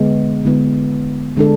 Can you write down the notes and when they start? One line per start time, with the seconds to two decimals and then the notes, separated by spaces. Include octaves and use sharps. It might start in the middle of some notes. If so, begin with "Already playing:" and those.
Already playing: D3 G#3 B3
0.45 D3 G#3 B3 E4
1.37 D3 G#3 D4 A4